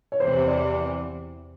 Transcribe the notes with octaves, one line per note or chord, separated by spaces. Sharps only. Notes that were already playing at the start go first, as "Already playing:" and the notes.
C#5
E2 C3 E3 C5
C5
D5